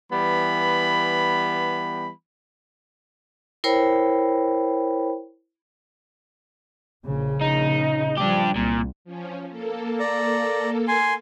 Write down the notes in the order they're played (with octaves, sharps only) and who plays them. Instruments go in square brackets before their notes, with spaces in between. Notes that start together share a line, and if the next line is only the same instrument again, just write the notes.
[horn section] E3 G3 B3 B5
[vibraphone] E4 A#4 C5 C#5 G5 B5
[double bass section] A#1 C#3
[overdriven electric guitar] D#4
[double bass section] F3 G3 [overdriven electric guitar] D4 G4
[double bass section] C2 [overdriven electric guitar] A#2
[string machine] F3 C#4
A#3 A4
[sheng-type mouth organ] D5 A#5
G#5 C6